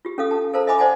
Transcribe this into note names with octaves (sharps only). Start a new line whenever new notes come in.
F4 G4
C#4 A4 F5 D#6
A5
A4 A#4 C5 F5 A5 A#5
D#5 E5 G#5 B5 D6 D#6
C5 D5 F#5 G#5 A5